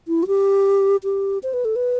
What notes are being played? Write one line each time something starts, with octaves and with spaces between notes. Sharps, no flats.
E4
F#4
G4
G4
C5
B4
A4
B4